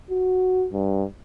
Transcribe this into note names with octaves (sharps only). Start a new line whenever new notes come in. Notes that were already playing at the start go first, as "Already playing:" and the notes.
F#4
G2